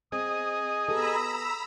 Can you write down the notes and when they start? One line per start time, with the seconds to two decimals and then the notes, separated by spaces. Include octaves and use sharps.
0.12 C4 G#4 D#5 D#6
0.89 B3 G4 A4 A#5 B5 E6